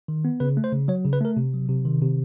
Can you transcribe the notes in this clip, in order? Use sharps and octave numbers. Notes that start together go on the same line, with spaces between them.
D#3
B3
C#3 B4
A3
C5
C#3
F#3 C#5
C#3
B4
A3 A#4
C3
F#3
C3
D#3
C3